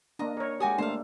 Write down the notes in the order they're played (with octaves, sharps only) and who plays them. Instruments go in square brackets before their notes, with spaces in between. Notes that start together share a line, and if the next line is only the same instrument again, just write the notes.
[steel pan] A#3 D4 [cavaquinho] D#5 A#5
[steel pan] A#4 C#5
[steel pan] G#3 G4 [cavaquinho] F#4 G#5 D#6
[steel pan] A3 A#3 D4 [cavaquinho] C5 F5